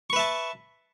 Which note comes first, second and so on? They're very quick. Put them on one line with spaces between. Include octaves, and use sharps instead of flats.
C#6 B4 E5 A5